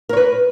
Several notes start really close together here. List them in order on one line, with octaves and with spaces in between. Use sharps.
A#4 C#5 B4